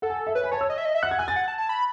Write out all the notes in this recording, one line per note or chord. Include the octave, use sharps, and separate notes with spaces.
A4 F#5
G#5
E5
B4 C#5
G#5
C#5 A5
E6
D#5
E5
D#5
E5
F#5 F#6
G#6
G#5 F#6
A6
F#5
A5
A5
B5